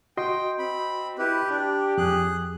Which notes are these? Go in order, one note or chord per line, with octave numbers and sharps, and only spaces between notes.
F#4 D#5 G5 C6
C4 B5
E4 G4 B4
D4 G4
F2 G#4 F#6